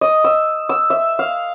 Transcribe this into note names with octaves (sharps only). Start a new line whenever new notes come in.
D#5
E6
E6
E5
F5